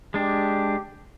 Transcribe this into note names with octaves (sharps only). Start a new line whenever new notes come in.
G#3 D4 G4